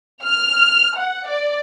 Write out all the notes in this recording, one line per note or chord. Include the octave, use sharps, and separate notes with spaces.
F6
F#5
D5